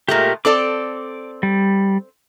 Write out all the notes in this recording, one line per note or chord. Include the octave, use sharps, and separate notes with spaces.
A#2 G#3 A3 G4 A#4
C4 A4 D5 D6
G3